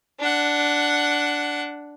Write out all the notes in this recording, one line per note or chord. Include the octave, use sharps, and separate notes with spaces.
D4 F#5